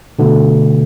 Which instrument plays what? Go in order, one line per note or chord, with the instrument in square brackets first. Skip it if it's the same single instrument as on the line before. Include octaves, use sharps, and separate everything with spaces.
[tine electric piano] B2 D3 A3